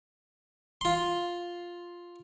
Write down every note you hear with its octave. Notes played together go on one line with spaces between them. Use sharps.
F4 C6